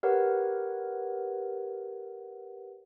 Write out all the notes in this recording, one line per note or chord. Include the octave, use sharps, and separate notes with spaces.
G4 A#4 B4 C#5 F#5